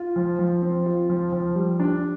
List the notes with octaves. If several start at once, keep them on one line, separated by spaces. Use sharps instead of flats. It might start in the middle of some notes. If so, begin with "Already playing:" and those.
Already playing: F4
F3
F3
C4
F4
F3
F3
G3
D4